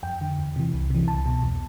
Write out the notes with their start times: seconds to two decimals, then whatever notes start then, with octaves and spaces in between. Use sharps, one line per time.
0.03 F2 G5
0.21 D3
0.39 E2
0.56 C3 E3
0.73 C2
0.90 C3 E3
1.07 C2 A5
1.26 B2
1.43 E2